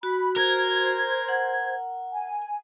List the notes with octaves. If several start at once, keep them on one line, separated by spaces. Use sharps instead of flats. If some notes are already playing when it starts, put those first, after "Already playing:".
F#4 B5
A#4 C5 G#6
F#5
G#5